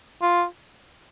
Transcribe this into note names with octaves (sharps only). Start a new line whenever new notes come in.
F4